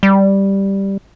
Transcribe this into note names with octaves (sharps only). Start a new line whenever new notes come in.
G3